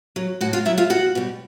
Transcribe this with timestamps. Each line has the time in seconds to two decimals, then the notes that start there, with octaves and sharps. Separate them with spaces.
0.16 F#3
0.41 A2 F#4 F#5
0.53 F4 F5
0.65 F#3 E4 E5
0.78 F4 F5
0.90 E2 F#4 F#5
1.15 B2 G3